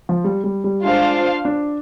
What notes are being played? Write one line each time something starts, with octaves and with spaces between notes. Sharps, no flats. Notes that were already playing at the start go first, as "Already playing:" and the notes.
F3
G3
G3
G3
G#3 D4 F4 C5 F5
D4